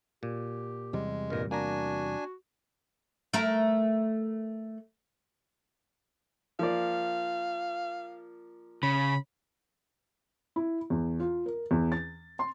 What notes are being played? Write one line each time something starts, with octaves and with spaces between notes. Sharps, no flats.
A#2 G4
E2 C3 G3 G#3
G2 A#2 A#4
A#3 D4 F#4 G#5 A#5
A3 A#4
F3 A#3 D5 F5
C#3 B5
E4
E2
F4
A#4
E2
A6
C6